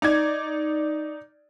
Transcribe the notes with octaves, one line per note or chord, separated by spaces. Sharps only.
D#4 D5 G#6